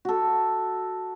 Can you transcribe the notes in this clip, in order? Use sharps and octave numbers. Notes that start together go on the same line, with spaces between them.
F#4 A4